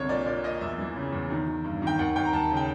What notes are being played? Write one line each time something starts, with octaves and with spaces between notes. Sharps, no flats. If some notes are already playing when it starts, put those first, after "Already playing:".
Already playing: C2 D3 C#5
A#2 D5
A#2 D5
A#2 D#5
E2 E5
E3
C#3
E2
D#3
D#3
G2
D#3
G5
D#2 F#5
D#2 G5
A#5
D#2 A5
C#3
G5